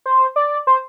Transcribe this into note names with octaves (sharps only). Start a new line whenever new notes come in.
C5
D5
C5